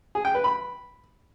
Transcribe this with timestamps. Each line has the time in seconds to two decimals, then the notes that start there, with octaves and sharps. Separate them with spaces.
0.15 G#4
0.25 G5
0.34 B4
0.44 B5